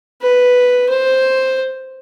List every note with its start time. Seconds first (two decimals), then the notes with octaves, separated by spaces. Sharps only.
0.22 B4
0.89 C5